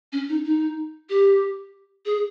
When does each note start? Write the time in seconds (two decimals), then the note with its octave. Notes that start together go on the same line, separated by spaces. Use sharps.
0.12 C#4
0.29 D#4
0.45 D#4
1.10 G4
2.06 G#4